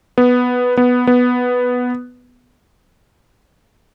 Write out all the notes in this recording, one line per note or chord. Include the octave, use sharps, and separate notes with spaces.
B3
B3
B3